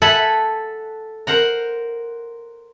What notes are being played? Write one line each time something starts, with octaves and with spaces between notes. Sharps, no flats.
A4 E5 F#5 G#5 B5
A#4 C5 F#5 A#5